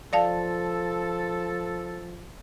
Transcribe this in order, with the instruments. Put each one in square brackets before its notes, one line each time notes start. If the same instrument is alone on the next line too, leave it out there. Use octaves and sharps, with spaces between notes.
[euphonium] F3 [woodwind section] A4 [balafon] D5 F5 A5